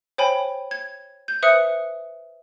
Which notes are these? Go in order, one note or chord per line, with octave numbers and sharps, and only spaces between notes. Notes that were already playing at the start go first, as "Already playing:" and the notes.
C5 C#5 G5 G#5 B5
G#6
G6
B4 C5 E5 D#6 F#6 C#7